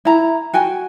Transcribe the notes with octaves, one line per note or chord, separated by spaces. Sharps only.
E4 A#5
F#4 G5 G#5